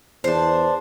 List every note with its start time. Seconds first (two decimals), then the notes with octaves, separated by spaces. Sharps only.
0.24 E2 D4 C5